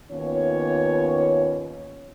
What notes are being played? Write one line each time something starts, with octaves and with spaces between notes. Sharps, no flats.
D#2 B3 C#4 F4 C#5